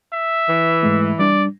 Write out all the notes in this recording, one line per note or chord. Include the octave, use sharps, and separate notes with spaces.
E5
E3
G#2 G#3 A3
G3 D4 D5